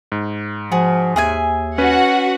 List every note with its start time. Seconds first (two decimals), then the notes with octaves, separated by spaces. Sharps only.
0.12 G#2
0.72 F3 F#4 G#4
1.16 D#2 G#4 E5 G#5
1.78 C#4 F#4 B4 F#5